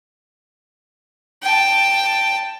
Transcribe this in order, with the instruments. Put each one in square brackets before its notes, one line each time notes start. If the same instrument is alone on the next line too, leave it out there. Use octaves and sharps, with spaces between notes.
[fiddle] G5 A5